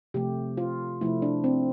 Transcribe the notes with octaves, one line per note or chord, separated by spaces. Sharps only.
C3 F3 A3 G4
F4
C3 F3 A3 E4
D4
C4